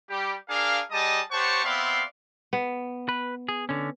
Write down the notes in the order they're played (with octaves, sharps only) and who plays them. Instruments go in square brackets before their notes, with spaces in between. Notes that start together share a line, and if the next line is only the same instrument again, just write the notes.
[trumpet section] G3 G4
D4 G#4 A#4 F5
G3 G4 G#4 D#5 A5 D#6
G4 C5 C#5 F#5 A5 C#6
B3 C4 D5 E5 F5 C6
[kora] B3
[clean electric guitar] B4
G#4
D3 C#4